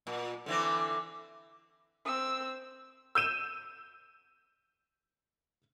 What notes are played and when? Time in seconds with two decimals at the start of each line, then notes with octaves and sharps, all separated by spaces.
0.07 A#2
0.46 D3 E3 C4
2.06 C4 E6
3.15 E6 G6 D#7 E7